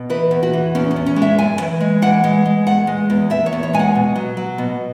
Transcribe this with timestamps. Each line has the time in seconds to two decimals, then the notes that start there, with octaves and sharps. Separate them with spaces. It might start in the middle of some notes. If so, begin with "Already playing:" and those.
Already playing: B2
0.10 E3 B4
0.31 E2
0.43 F#4
0.53 E3
0.75 E2 C#4
0.91 C#4
0.96 E2
1.06 C#4
1.16 G#3
1.22 E5
1.38 F#2 G#5
1.60 E3
1.81 G#3
2.02 E3 F#5
2.24 G#3
2.46 G#3
2.67 E2 F#5
2.87 G#3
3.10 E2
3.30 E2 E5
3.46 C#5
3.53 E2
3.63 C#5
3.73 G#3 G#5
3.79 F#5
3.95 B2
4.16 F#3
4.37 F#3
4.58 B2